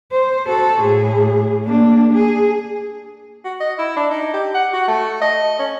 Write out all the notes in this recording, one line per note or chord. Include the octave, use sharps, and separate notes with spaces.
C5
F#4 A4
A2 G#4
A#3 D4
G#4
F#4
D#5
E4
D4
D#4
G4
F#5
F#4
A3
D#5
C#4